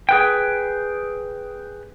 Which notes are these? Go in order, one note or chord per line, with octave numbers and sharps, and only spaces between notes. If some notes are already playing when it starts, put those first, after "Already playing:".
G#4 B4 G5